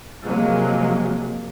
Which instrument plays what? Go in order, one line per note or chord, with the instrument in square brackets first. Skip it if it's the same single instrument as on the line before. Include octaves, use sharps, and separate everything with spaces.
[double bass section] C3 F3 F#3 G#3 A#3